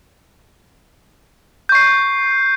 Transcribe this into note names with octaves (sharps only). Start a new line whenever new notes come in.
C#6 G6 C7